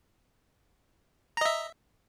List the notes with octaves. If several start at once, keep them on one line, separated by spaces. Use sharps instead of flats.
D#5 E5 A#5